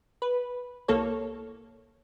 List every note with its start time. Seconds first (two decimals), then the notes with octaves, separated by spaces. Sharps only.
0.22 B4
0.88 C2 A#3 A4 C#5